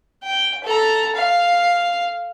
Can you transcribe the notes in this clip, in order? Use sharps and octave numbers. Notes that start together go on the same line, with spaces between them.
G5
A4 A#5
F5